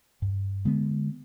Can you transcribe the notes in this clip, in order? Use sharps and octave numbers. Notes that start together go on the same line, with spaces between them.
G2
D3 G#3 B3